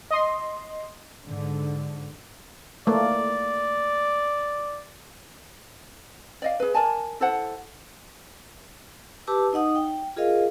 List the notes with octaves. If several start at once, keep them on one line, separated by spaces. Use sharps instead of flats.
D#5 C6
G#2 D3
A3 A#3 D5
D5 D#5 F5
G#4 B4
A#4 D5 G#5 A5
E4 A4 C5 F#5
G4 B4 A5 D6 E6
D#4 D#5 F#5 D#6
G5
F4 G#4 A#4 D#5 F5